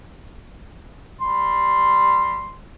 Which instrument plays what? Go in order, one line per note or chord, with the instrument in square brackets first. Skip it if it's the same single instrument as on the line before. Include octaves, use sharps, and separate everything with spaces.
[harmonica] G3 C6